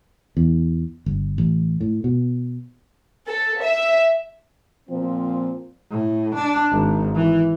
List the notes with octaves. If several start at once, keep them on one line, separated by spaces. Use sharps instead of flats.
E2
G1
A1
A2
B2
A4
E5
A#2 F3 C4
A2
D4
G#1
E3